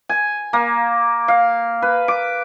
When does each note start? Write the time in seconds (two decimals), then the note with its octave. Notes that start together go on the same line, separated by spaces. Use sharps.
0.09 G#5
0.53 A#3
1.28 F5
1.82 B4
2.08 D6